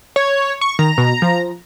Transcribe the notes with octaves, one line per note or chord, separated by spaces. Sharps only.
C#5
C#6
D#3 A#5
B2
F3